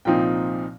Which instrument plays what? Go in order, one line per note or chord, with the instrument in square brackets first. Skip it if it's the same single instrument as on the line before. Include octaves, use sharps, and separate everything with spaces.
[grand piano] C2 A#2 F3 C4 D#4 G5